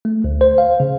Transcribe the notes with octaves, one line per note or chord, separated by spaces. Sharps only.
A3
D2
C5
F5
C#3